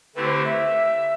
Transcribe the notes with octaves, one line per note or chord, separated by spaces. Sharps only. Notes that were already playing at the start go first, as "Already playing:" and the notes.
D3 A3 C4 E4 G4 B4
C5
E5